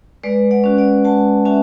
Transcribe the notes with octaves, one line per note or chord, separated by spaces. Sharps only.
G#3 B4 D5
D5 F#5
C#4 F#4
D5 F#5
G#3 F#5 A5
C#4 F#4 E5 G#5